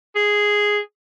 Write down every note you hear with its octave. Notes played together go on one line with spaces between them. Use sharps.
G#4